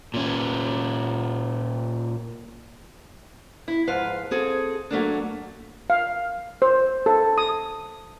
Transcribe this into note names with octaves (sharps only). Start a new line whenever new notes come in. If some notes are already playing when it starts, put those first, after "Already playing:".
A#2 C#4
E4
G#2 F3 B4 F5
C4 G#4 A4
F#3 A3 A#3 D4
F5
C5
A4
D#6